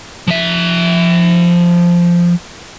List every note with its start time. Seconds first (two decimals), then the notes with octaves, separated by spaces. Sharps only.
0.27 F3 E5